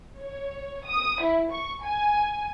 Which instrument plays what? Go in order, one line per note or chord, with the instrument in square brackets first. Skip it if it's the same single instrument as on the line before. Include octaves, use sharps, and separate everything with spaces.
[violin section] C#5
D#6
E4
C#6
G#5